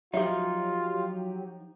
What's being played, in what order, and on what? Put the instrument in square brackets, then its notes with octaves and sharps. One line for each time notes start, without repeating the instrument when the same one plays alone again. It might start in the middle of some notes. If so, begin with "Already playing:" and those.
[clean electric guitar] F3 D#4 [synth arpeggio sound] F#3 G4 [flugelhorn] F4 [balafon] E5